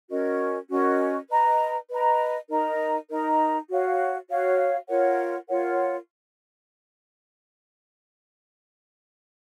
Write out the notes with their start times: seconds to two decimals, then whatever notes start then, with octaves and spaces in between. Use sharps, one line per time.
0.10 C#4 F#4 A#4 D#5
0.69 C#4 F#4 A#4 D#5
1.30 B4 D#5 A#5
1.89 B4 D#5 A#5
2.49 D#4 A#4 D#5 A#5
3.09 D#4 A#4 D#5 A#5
3.69 F#4 C#5 F5
4.29 F#4 C#5 F5
4.89 F4 A#4 C#5 F#5
5.49 F4 A#4 C#5 F#5